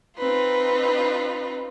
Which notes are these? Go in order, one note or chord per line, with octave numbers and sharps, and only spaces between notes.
C4 D#4 F4 B4